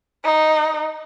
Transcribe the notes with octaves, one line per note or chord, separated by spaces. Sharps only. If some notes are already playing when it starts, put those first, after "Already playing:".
D#4